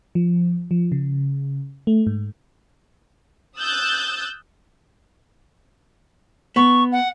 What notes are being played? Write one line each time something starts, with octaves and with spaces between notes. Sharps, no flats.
F3
F3
C#3
A3
G#2
D#6 E6 F#6 G6 A6
B3 C#6
F#5